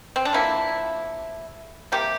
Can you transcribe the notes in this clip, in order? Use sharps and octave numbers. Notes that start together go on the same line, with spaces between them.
C4
D4
D3 F3 A#3 E4
C3 G3 A#3 G4